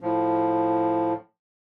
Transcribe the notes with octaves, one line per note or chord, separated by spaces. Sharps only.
A2 F3